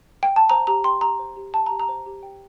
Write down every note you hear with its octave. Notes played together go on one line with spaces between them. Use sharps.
G5
A5
C5 A#5
G4 A#5
G5 C6
G4 A#5
C5
G4
G5 A5
A#5
G4
A#5
C5
G4
G5